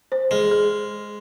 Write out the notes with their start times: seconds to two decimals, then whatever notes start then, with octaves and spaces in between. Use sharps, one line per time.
0.12 C5
0.31 G#3 G#4
0.51 G#4